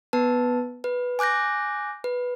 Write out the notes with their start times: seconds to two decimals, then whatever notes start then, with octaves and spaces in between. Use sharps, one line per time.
0.13 B3 B4 A5
0.84 B4
1.19 G#5 D6 F#6 G6 A#6
2.04 B4